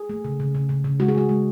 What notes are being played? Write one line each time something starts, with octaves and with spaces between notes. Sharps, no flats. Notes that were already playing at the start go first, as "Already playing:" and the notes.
Already playing: G#4
A3
C#3
C#3
C#3
C#3
C#3
G#3 F#4
G#4
G#3 F#4
G#3